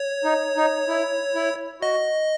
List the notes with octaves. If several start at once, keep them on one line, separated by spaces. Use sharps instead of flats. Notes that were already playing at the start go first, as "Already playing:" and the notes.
Already playing: C#5
D#4
D#4
E4
E4
F#4 D#5